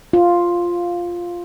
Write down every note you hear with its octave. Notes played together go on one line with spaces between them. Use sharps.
F4